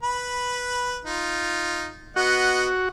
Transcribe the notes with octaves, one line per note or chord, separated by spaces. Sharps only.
B4 B5
D#4 F4
B3 F#4 D#5 F#5